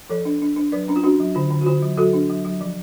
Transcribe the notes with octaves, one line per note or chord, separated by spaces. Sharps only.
F3 A4 C#5
D4
D4
D4
F#3 B4 D5
C#4 D4
F4
C#4 D4 F#4
F#3
D3 F4
D3
F#4
D3 F4
F#3
F#3 F#4 A4
D4
F#3
F#3
F3